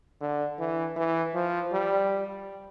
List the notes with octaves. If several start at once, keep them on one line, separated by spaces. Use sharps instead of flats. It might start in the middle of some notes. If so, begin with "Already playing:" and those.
D3
E3
E3
F3
G3